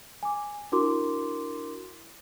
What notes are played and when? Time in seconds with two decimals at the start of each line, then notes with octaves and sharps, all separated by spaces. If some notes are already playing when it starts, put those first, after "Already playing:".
0.23 G#5 D6
0.72 D4 E4 F#4 A#4 C6 D6